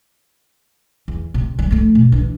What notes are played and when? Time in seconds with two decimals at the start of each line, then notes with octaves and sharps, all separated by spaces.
1.08 E2
1.34 C3
1.58 D3 F#3
1.71 F3 A3
1.95 B2
2.12 E3 D4